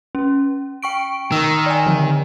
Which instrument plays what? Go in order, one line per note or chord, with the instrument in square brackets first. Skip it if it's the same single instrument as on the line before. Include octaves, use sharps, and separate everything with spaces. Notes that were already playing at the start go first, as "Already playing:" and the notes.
[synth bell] C#4
G5 C#6 D7
[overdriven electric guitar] D#3 [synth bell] E6
[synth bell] D5 G#5
D3 F3